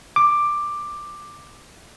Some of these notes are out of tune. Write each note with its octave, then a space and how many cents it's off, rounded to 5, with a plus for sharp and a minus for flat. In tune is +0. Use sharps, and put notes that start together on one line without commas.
D6 +10